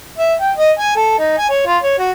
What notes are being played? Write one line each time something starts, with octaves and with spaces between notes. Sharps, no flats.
E5
G5
D#5
G#5
A4
D#4
G#5
C#5
F4
C#5
F#4